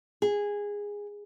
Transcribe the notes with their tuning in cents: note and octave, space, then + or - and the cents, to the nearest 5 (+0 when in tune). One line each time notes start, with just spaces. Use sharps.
G#4 -15